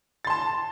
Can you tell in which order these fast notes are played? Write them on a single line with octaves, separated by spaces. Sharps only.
A6 C6 A5